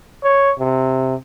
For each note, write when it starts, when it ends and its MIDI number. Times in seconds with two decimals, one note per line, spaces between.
0.23 0.51 73
0.59 1.14 48